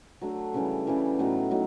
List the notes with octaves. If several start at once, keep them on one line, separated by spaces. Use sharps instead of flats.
F#3 A3 D4
C#3 E3 G3
C#3 E3 G3
A2 F#3 B3 D#4
A2 F#3 D#4